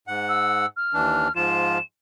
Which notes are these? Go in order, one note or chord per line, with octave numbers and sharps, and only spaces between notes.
G#2 F#5
E6
F6
D#2 E3 D4
G#2 F3 F4 E7